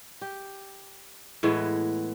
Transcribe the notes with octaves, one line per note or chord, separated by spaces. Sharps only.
G4
A2 E3 G#3 B3